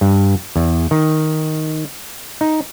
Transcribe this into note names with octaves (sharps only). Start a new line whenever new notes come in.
G2
E2
D#3
D#4